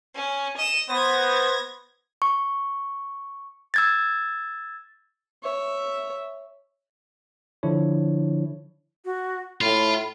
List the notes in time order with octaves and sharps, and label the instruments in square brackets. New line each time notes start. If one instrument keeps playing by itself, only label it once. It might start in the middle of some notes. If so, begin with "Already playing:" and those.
[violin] C#4
D#5 E7
[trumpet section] B3 C5 [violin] G#6 A#6
[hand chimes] C#6
E6 G#6 A6
[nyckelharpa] C#5 E5
[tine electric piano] D3 F3 D4 E4 C#5
[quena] F#4
[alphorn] A2 [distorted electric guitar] F4 [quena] B5